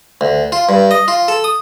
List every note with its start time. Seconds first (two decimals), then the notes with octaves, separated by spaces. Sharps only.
0.21 D2
0.52 F4
0.69 G2
0.91 D#5
1.08 F4
1.28 A4
1.44 D#6